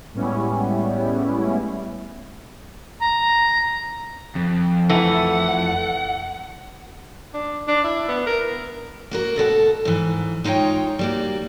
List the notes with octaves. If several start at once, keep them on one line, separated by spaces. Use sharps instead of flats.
A2 G3 G#3 B3 C#4 E4
A#5
F2
E3 A3 F#5
D4
D4
E4
B3
A#4
A#3 F#4 A#4
B2 A4 C5 F#5
G#2 E3
G#3 D#4 F4 C#5 G5
G3 A#3 F#4